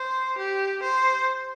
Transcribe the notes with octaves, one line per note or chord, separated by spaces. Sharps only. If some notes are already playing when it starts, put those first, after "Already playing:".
Already playing: C5
G4
C5